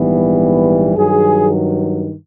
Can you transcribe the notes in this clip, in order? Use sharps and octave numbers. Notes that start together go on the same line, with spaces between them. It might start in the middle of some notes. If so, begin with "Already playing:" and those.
Already playing: A#1 G#2 E3 G3 B3
G2 D#3 F#3 G#4